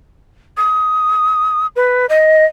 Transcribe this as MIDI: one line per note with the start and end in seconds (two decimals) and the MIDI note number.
0.57 1.67 87
1.76 2.06 71
2.09 2.46 75